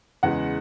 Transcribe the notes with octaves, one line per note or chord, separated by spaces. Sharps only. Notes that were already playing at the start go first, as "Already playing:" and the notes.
E2 C#3 G#3 F#5